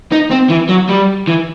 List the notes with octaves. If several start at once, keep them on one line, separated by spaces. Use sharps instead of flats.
D#4
C4
E3
F#3
G3
E3